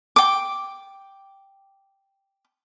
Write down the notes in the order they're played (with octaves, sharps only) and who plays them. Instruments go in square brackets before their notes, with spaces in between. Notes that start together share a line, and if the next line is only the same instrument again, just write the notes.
[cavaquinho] G5 D6